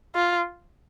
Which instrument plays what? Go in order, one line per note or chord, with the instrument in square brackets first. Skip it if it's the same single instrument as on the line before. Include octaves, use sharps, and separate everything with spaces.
[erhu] F4